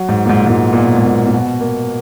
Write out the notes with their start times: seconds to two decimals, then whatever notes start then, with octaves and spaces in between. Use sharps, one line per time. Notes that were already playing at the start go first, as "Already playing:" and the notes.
Already playing: F#3
0.09 G#2
0.26 A#2
0.29 G#2
0.46 G#2
0.50 A#2
0.73 A#2
0.78 B2
0.96 G#2
1.05 A#2
1.27 A#2
1.34 B2
1.60 A#3